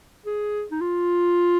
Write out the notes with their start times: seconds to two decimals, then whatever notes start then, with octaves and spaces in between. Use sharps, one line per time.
0.26 G#4
0.71 D#4
0.81 F4